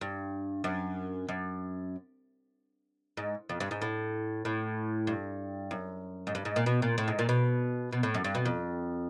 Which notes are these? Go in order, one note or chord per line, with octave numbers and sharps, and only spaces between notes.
G2
F#2
F#2
G#2
F2
G2
G#2
A2
A2
G2
F#2
G#2
G2
G#2
A#2
B2
A#2
A2
G#2
A#2
B2
B2
A2
F#2
G2
B2
F2